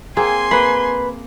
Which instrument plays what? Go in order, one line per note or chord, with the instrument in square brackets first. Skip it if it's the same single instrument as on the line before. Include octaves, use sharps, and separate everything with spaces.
[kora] A#3 C4 G#4 [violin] G#5 C6
[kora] A#3 [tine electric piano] B4 B5